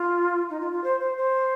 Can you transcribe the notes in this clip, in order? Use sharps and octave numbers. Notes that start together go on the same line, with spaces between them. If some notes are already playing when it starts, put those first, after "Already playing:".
Already playing: F4
D#4
F4
F4
C5
C5
C5